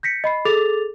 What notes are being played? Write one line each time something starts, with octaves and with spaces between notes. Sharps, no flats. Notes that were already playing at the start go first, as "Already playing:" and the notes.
G6 A#6 B6 C#7
D#5 B5 C7
G#4 A4 D6 A6 F7